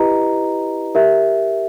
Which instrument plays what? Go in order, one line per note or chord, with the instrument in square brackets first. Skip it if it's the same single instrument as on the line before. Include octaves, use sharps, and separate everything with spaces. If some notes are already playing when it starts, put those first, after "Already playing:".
Already playing: [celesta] E4 G4 B4 D#5 A#5
G4 A#4 E5